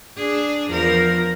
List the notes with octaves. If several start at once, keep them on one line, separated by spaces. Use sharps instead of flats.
D4 G#4
E2 F3 A#4